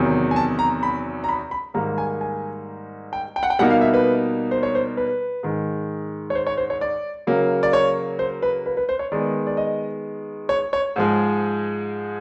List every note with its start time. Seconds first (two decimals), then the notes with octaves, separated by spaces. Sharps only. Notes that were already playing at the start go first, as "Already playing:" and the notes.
Already playing: E2 C3 D#3 F#3
0.31 G#5
0.36 A5
0.59 A#5
0.83 B5
1.24 A#5
1.29 B5
1.51 B5
1.74 G#2 D#3 G3 A#3 A#5
1.98 G#5
2.21 G#5
3.13 G5
3.36 G5
3.43 F#5
3.50 G5
3.59 B2 G3 A#3 D#4 F#5
3.70 F5
3.81 E5
3.94 B4
4.51 C5
4.63 C#5
4.75 C5
4.97 B4
5.43 G#2 D#3 G#3
6.30 C#5
6.35 C5
6.47 C#5
6.57 C5
6.70 C#5
6.81 D5
7.27 C#3 F#3 A#3
7.63 D5
7.73 C#5
8.19 C5
8.42 B4
8.66 B4
8.77 B4
8.89 C5
8.99 C#5
9.12 D#3 G#3 B3 D5
9.47 D5
9.57 D#5
10.49 C#5
10.73 C#5
10.96 G#2 F3 G#3